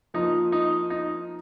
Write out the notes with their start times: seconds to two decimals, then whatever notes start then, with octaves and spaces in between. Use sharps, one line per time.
0.14 F3 A#3 D#4 F4 A#4
0.52 D#4
0.90 D#4